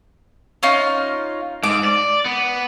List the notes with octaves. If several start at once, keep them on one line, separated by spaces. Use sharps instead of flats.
C#4 D#4 F4
G#2 D6
D5
B3